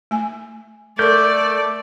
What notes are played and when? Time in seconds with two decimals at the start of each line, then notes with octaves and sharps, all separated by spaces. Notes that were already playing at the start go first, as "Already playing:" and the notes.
0.11 A3 G#5
0.99 A3 A4 A#4 D5 G6